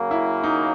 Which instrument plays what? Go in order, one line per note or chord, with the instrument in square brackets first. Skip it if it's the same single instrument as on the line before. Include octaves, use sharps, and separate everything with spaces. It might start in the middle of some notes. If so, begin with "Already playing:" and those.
Already playing: [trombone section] C#3 F#3 A#3
[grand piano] E4
D#4